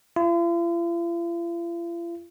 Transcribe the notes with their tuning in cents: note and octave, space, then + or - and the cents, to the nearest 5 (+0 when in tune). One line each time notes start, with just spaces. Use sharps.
F4 -45